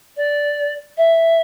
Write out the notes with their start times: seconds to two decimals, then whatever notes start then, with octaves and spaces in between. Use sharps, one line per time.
0.17 D5
0.97 E5